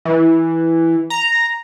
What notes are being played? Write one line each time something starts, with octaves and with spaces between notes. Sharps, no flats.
E3
A#5